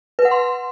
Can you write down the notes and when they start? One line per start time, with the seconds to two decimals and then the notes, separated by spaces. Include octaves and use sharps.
0.19 B4
0.25 F#5
0.31 C6